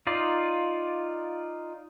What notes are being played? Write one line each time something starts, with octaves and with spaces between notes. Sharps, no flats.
D#4 F4 D5